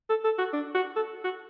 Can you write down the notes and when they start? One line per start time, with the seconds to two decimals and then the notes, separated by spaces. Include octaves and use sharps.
0.09 A4
0.24 A4
0.38 F#4
0.53 D4
0.74 F#4
0.96 A4
1.24 F#4